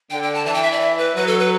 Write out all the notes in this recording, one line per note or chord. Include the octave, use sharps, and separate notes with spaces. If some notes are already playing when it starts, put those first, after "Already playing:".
D3 G5
G5
A5
E3 A5
G5
E5
D5
E5
B4
F#3 B4
A4
B4